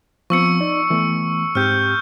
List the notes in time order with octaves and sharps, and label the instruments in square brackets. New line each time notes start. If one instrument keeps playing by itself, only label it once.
[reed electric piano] F3 B3 C4 [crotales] C#6 E6 C#7
[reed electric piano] D#4 D5
E3 A3 B3
[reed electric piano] G#2 C4 G4 [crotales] F6 G6